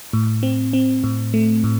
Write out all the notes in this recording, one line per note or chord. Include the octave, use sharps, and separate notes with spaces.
A2
C4
C4
A2
A3
A2